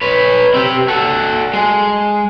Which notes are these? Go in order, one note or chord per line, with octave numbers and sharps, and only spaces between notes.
B4 C#5
C4 G4
F#4 A4
G#3